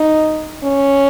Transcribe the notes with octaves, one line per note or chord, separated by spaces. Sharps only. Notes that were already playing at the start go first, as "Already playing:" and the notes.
Already playing: D#4
C#4